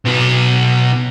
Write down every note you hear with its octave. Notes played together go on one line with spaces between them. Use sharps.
B1 B3